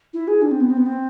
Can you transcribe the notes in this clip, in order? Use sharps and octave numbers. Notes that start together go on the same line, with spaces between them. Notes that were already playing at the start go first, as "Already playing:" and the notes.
E4
G#4
D4
C4
B3
C4
B3
C4